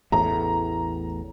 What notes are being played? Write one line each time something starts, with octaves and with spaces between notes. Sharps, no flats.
A1 E2 A2 A#5